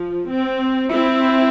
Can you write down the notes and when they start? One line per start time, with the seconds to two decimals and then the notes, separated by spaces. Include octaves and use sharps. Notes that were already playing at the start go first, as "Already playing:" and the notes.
Already playing: F3
0.31 C4
0.92 C4 E4